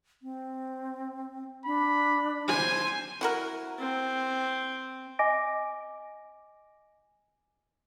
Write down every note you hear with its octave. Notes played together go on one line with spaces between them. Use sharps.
C4
D4 B5
C5 G#5
E4 F#4 A#4
C4
D#5 G#5 D6 A#6 D7